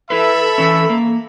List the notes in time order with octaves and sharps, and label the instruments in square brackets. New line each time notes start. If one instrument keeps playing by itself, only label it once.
[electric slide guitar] E4 B4 [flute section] A4 [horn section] E5 B5
[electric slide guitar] E3 C#4
A#3